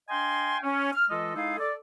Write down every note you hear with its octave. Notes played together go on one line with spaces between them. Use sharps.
D4 D#5 F5 G5 G#5 C6
C#4
F6
E3 G#3 F4 A4 D#5
G#3 D#4 E4 G#4 A4 F5
A4 D5